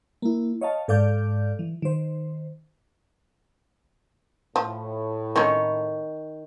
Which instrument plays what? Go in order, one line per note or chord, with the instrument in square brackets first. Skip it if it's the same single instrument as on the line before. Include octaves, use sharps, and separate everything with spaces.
[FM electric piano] A#3 E4
C#5 D#5 F5 A5
G#2 A4 D5 F5 D6 G6
E3
D#3 C5
[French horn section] A2 [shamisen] F3
[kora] D#3 C#5 [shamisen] C4 C#4